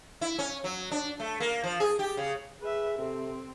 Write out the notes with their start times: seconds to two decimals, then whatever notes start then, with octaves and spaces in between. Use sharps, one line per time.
0.21 E4
0.39 C#4
0.64 F#3
0.91 D4
1.20 A3
1.40 A#3
1.64 F3
1.80 G#4
1.99 G4
2.17 C#3
2.62 G#4 B4 E5
2.99 C3 C4 A4